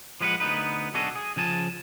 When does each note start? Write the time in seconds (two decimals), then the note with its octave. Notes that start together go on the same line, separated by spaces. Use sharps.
0.21 F3 G#3 B4 C5 F#5
0.40 D2 B3 D#4 B4
0.94 B1 D4 F#4 G#4 A4 D#5
1.16 G#4
1.36 C#3 F3 G#5 A5